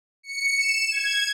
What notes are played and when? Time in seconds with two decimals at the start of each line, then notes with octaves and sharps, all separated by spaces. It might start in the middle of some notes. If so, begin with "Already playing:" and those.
0.23 C#7
0.57 E7
0.92 G#6